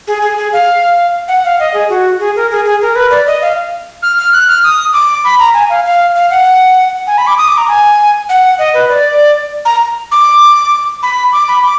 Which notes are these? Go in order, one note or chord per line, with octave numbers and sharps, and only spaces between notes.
G#4
G#4
G#4
F5
F#5
F5
D#5
G#4
F#4
G#4
A#4
G#4
G#4
A#4
B4
D5
D#5
F5
F6
F6
F#6
F6
D#6
D6
B5
A#5
G#5
F5
F5
F5
F#5
G#5
B5
D6
D#6
D6
A#5
G#5
F#5
D#5
B4
D5
A#5
D6
B5
D6
B5
D6